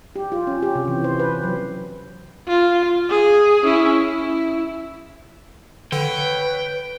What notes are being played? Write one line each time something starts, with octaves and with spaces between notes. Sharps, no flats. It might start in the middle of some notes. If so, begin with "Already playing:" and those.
G4
F4
C#4
G4
C3
E3
C5
B4
F#3
F4
G#4
C#4 E4
E4
D3 B4 C#5 G5